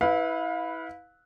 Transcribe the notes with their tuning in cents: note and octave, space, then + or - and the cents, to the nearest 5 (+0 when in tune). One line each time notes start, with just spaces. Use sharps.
E4 -20 B4 +0 F5 +25